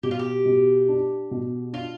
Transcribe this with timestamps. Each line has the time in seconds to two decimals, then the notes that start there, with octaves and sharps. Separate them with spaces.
0.03 B2 G4
0.11 F4
0.19 G4
0.45 B2
0.89 D4
1.31 B2
1.73 D4 F4